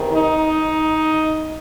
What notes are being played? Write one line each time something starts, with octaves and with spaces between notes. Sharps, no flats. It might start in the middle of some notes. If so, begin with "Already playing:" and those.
Already playing: E2 C3 D#3
D#4